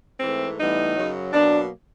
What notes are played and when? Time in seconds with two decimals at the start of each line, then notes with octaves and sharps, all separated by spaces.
0.20 G#2 E3 A3 C4
0.57 A2 E3 G3 B3 D#4
0.95 F#2 C#3 F#3
1.32 B2 F#3 A#3 D4